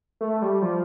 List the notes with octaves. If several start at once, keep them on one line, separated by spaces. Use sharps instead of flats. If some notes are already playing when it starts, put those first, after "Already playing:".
A3
G3
F3